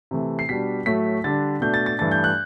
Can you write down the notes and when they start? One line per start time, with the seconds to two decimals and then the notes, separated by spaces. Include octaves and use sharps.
0.11 C3 E3 A3
0.39 C7
0.49 B2 G3 D4 B6
0.86 A2 F#3 A3 B6
1.24 D3 G3 D4 A6
1.61 B2 A3 D4 G6
1.74 A6
1.86 A6
1.98 G2 E3 A3 D4 A6
2.11 G6
2.24 F#6